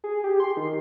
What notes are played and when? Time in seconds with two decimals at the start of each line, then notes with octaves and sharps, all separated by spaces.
0.04 G#4
0.24 G4
0.40 C6
0.57 D#3